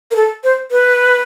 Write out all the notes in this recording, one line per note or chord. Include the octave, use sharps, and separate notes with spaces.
A#4
A4
C5
B4